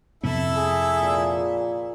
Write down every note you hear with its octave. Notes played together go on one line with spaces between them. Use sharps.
F2 C3 B3 E4 A4 E5
G#4
A#2